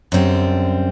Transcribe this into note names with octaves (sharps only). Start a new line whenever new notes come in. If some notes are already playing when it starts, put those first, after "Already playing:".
F#2 D3 G3 C4